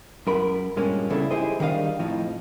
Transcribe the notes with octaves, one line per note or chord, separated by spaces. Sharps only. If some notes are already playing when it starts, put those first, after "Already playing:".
F#2 A#4 B5
G2 A#2 G#3 A#3 C#4
E2 G2 C#3 D4 E4 A4
D#4 E4 G4 G#4 C5 D#5
D#3 G3 D4 D#5 F5
F2 A2 F3 D#4